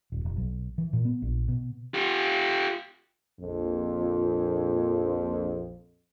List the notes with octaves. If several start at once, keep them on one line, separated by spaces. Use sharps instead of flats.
D#1
F1
B1
E3
A#2
B3
A#1
B2
F4 G4
A#1 F2